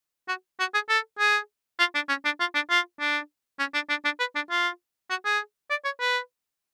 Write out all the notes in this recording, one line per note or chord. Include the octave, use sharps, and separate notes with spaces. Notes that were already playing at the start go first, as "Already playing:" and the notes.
F#4
F#4
G#4
A4
G#4
F4
D4
C#4
D4
F4
D4
F4
D4
C#4
D4
D4
D4
B4
D4
F4
F#4
G#4
D5
C#5
B4